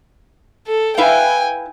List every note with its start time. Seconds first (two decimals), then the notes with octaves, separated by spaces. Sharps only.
0.67 A4
0.97 E4 B4 F5 G5 G#5